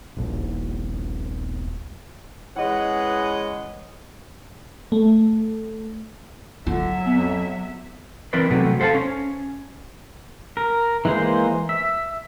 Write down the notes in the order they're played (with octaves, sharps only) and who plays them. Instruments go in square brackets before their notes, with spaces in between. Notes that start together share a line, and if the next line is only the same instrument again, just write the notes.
[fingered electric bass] D#1 A#1
[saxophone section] E3 G#3 C#4 B4 D#5 F#5
[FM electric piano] A3
[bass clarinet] D3 [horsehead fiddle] F#3 E5 [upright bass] F4
[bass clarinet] F2 [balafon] B3
[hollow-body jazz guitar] E3 C4 A#4 B4 D5 C6
C2 C3 F#3 A3 B3
A4 C5 F5 F#5 A5
C#4
[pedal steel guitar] A#4
E3 G#3 A#3 C5
E5